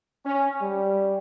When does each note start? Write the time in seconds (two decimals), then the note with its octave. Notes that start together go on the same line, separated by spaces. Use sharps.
0.24 C#4
0.61 G3